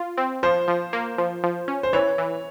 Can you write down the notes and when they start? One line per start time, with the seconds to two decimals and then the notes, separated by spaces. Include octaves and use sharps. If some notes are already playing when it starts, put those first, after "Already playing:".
Already playing: F4
0.18 C4
0.43 F3 C5
0.68 F3
0.93 A#3
1.18 F3
1.43 F3
1.68 C#4
1.83 C5
1.93 E3 C#5
2.18 E3